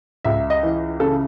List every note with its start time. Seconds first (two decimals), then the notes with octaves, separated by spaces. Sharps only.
0.25 C#2 E5
0.50 D#5
0.63 E3
1.00 C#3 A4